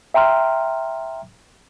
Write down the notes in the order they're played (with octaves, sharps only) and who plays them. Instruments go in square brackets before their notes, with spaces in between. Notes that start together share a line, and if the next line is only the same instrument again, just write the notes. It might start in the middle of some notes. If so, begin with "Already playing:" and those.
[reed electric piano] E5 G5 A#5 C6 F6